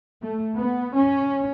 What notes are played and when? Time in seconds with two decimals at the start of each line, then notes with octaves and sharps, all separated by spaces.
0.22 A3
0.57 B3
0.94 C#4